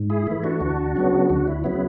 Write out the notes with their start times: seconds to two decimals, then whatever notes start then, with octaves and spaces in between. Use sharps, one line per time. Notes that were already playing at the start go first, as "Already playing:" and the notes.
Already playing: G#2
0.10 E4 G#4
0.27 E3 A3 E4
0.43 D4 F#4
0.61 D2
0.96 C#3 F#3 B3
1.30 D2 D4 F#4
1.48 E4
1.64 C#3 F#3 B3 E4